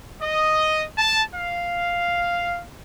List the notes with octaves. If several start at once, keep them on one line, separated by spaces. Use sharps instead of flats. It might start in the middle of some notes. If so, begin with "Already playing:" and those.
D#5
A5
F5